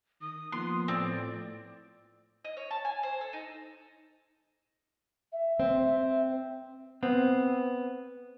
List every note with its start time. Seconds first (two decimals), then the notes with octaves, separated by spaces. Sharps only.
0.21 D#3 D#6
0.52 F3 A#3 B3 C6 D#6 F#6
0.88 A2 C4 D5
2.45 D#5
2.57 C#5
2.71 A5
2.85 G#5
3.03 C5
3.21 A4
3.33 D#4
5.32 E5
5.60 C4
7.03 B3 C4